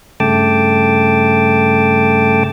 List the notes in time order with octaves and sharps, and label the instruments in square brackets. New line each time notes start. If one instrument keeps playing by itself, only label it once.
[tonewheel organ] G2 C#3 A3 G5 A5 D6